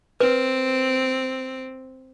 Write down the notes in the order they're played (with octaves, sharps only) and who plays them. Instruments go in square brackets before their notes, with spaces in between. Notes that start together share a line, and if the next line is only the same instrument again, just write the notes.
[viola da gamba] C4 [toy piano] B4